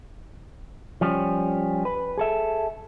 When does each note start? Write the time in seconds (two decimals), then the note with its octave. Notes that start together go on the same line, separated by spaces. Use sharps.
1.01 F3 G3 C#4
1.85 B4
2.18 G#4 A4 E5